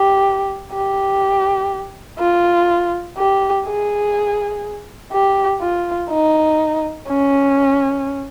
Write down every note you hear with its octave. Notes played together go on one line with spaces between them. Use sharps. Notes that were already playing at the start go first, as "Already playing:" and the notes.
Already playing: G4
G4
F4
G4
G#4
G4
F4
D#4
C#4